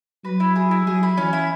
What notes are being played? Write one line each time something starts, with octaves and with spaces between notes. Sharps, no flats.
F#3 B4
E4
G#4
E4
F#3 G#4
E4
E3 C#4
E4